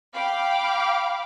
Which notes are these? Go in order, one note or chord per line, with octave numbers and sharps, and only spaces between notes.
F5 G5 B5 D6